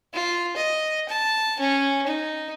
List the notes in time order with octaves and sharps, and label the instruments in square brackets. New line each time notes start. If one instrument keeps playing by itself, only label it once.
[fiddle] F4
D#5
A5
C#4
D#4